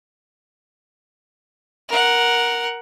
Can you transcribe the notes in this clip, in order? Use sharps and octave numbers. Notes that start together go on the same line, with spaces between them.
A#4 F#5